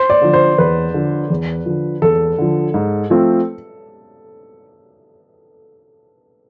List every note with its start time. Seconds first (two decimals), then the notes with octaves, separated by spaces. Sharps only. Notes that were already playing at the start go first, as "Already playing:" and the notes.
Already playing: C5
0.10 D5
0.22 D3 F3
0.33 C5
0.58 E2 B4
0.94 D3 F3
1.30 E2
1.66 D3 F3
2.02 E2 A4
2.38 D3 F3
2.74 G#2
3.10 F3 A3 C4 F4